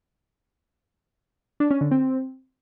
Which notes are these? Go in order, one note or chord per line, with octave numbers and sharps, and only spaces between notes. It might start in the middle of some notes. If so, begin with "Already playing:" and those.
D4
C#4
D3
C4